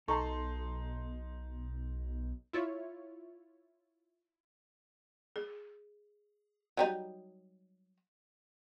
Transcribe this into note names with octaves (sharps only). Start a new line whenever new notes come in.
B1 D#4 A4 A#5 C6 C#6
E4 F4 C#5
G#4
F#3 G3 D#4